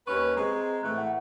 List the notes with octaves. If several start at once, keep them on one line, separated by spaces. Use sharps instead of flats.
D#2 C#4 B4 C#6
G#3 C4 A#5 C#6
A#5
A2 E3 A3 C#6 F#6
F#5